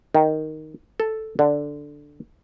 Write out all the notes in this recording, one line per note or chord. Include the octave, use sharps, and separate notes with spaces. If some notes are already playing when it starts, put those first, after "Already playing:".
D#3
A4
D3